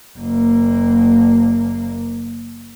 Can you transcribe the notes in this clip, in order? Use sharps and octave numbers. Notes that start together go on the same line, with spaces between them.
F#1 A#3